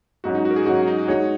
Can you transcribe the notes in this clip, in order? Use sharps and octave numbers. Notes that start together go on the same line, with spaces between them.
G#2 F#3 C#4 F#4
D#4
F#4
A#4
G#4
G#2 F#3 C#4 F#4
D#4
G#3 D#4 F#4 C#5